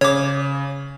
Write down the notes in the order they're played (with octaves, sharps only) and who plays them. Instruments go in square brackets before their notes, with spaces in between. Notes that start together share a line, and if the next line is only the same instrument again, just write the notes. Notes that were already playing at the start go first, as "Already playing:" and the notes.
[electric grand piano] C#3 [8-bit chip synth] C#5 D6